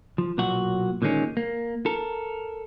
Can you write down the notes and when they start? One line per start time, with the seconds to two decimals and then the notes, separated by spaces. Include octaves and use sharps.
0.18 F3
0.38 B1 A#2 F#3 F#4 F#5
1.02 A#2 D3 D#3 G#3 C#4
1.37 A#3
1.86 A4 A#4